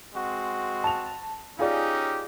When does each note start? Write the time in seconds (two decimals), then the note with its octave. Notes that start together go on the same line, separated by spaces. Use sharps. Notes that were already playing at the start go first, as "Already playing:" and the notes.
0.14 G#3 C4 F#4
0.84 A5 F7
1.59 C#4 D#4 F4 G4 G#4 D5